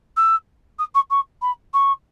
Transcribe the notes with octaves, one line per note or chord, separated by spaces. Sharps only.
E6
D#6
C#6
C#6
B5
C#6